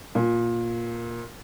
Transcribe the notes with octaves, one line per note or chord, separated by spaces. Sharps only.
A#2